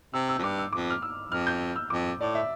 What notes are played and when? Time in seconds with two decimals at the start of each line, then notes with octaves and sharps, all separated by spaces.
0.14 C3 E6
0.29 E6
0.39 F2
0.43 G2 D6
0.58 E6
0.73 F2 D6
0.90 F6
1.02 E6
1.32 F2 F6
1.47 G6
1.76 E6
1.90 F2 D6
2.20 A2 D5
2.35 E5